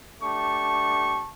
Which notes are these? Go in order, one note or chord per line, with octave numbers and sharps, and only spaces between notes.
A3 D4 G4 A5 C#6